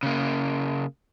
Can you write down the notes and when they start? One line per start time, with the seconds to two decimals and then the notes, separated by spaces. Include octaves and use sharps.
0.03 C#3 A#3